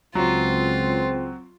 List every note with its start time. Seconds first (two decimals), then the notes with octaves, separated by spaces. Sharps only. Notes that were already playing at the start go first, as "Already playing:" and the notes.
0.15 C#2 F#3 C4 F4